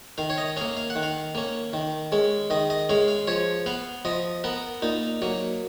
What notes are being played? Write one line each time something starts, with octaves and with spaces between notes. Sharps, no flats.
D#3 F5
C#5
D#5
A#3 C#4 F5
F5
F#5
D#3
F5
A#3 C#4
D#3
G#3 C#4
D#3 D#5
D#5
G#3 C#4 F5
F5
F3 C#5
B3 F5
F3 D#5
B3 A#4
A#2 D#4
F#3 A#3